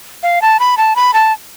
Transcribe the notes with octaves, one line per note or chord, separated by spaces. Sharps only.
F5
A5
B5
A5
B5
A5